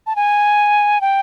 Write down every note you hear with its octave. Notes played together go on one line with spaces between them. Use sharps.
A5
G#5
G5